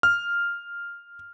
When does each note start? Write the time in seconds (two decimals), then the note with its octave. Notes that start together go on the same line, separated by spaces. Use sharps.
0.03 F6